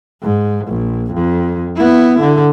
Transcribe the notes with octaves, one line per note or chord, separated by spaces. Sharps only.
G#2
A#1
F2
B3 E4
D3